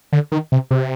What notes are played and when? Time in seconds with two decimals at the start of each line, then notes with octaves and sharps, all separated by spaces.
0.13 D3
0.32 D#3
0.52 C3
0.71 C3